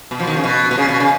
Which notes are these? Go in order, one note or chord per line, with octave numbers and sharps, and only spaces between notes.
B2
F3
D#3
C#3
B2
B2
C#3
B2
C#3